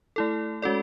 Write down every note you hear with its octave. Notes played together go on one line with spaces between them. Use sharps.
A3 E4 A4
G#3 C#4 F#4 A4 D5